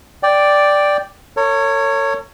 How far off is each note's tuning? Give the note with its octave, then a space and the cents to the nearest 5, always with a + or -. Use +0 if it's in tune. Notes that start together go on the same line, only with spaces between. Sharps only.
D5 +0 G5 +0
A#4 -45 C#5 +0